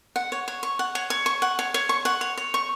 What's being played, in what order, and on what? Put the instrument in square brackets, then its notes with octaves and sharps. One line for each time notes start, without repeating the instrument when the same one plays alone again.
[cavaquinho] F#5
C#5
C#5
C#6
F#5
C#5
C#5
C#6
F#5
C#5
C#5
C#6
F#5
C#5
C#5
C#6